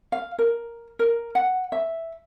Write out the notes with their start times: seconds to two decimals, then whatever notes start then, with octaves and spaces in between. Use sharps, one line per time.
0.12 F5
0.39 A#4
0.99 A#4
1.35 F#5
1.72 E5